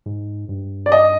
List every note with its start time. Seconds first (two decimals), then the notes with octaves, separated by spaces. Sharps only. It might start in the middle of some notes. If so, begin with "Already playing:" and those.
0.06 G#2
0.49 G2
0.86 D5
0.92 D#5